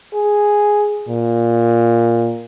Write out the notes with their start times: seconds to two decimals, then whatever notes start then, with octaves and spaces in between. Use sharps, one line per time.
0.14 G#4
1.08 A#2